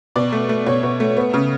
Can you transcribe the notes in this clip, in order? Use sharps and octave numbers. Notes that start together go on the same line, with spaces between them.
B2 D5
A3
A3
B2 C#5
B2
A3
B3
C#3